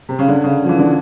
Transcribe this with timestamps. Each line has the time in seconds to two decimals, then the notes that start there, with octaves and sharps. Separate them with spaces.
0.09 C3
0.19 C#3
0.28 D3
0.44 C#3
0.64 F3
0.69 E3
0.79 D3